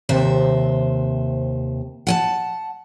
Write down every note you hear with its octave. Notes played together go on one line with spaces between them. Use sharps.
D#2 C3 C5 E5
F#5 G#5 A5